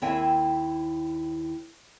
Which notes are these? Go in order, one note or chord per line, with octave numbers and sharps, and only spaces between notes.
D#2 C4 E4 E5 G5 G#5